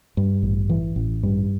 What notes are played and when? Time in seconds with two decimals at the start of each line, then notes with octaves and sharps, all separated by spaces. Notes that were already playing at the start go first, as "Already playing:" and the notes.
0.17 G2
0.43 A1
0.69 E3
0.96 A1
1.23 G2